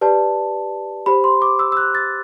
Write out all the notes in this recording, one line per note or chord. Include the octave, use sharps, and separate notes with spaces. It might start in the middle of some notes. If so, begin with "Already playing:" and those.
G4 B4 D5 A5
G4 C5 B5
C6
D6
E6
E6
F#6
A6